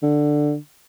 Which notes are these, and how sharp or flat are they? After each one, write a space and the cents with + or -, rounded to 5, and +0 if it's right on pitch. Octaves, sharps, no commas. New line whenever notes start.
D3 +10